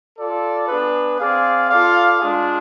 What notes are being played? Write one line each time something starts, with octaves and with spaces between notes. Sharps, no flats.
F4 A4 D5
B3 D4 G#4 B4
C4 G#4 D5 F5
F4 A4 D5 F5
G#3 D4 F4 G#4